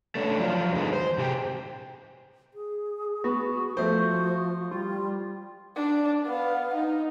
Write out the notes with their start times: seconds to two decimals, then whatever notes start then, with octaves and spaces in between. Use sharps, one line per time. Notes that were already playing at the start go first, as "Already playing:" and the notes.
0.15 A3 C#4 D4
0.38 F3 F#3 F4
0.74 E2 D3 D#3 G#3 B3
0.93 C5
1.18 C3 G4 G#4 A#4 G5
2.54 G#4
3.24 B3 F#4
3.77 F3 A3 C5
4.71 G3 F4
5.76 D4
6.26 B3 F5
6.74 D#4